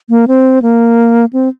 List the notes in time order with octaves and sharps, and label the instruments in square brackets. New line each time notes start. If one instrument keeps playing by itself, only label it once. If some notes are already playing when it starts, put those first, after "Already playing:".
[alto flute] A#3
C4
A#3
C4